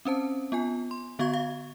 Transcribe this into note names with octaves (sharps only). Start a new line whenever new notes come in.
C4 C#4 C5 A5
B3 F4 G#5
C6
D3 B3 F#4 F5 C#6 G#6
F5